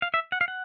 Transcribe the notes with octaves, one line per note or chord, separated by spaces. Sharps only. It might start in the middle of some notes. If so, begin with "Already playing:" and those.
F5
E5
F#5
F5
F#5